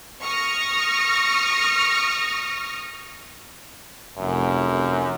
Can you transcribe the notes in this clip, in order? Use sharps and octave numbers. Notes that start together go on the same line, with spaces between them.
C#6 D#6 F6 A#6
F1 F#2